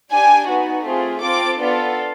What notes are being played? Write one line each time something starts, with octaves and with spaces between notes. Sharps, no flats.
D4 G4 G#5
B3 D#4 F#4
A3 C4 F4 G#4
C4 F4 A4 D6
B3 D4 F4 A4